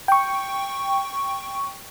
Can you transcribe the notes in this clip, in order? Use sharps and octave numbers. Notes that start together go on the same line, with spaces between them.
G5 C#6